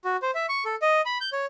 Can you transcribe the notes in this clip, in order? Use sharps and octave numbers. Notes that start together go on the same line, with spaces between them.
F#4
C5
E5
C#6
A4
D#5
B5
G6
C#5